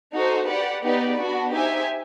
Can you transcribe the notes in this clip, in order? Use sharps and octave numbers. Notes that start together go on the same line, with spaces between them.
D#4 F#4 A4 C5
G4 B4 D5 F#5
B3 D#4 G4 B4 D5
B3 D4 F#4
D#4 G4 C5 E5 G#5